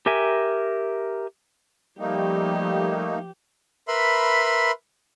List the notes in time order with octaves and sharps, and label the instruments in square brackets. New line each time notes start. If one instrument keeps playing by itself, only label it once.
[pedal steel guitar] G4 A#4 E5 G#5
[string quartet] F3 G4 [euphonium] G3 [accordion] A3 A#3 D#4
[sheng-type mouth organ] A#4 B4 E5 B5 C6